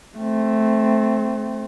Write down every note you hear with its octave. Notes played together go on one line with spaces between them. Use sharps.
A3 C4